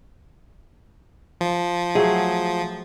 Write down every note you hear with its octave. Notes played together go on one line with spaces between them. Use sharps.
F3
F#3 A3 G#4